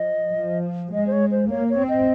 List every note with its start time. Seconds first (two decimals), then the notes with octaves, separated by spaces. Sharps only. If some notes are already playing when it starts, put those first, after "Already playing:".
Already playing: F3 D#5
0.36 F3
0.93 G#3 D#5
1.07 C5
1.12 C#5
1.31 C5
1.50 A#3 C#5
1.70 C#5
1.79 C4
1.89 D#5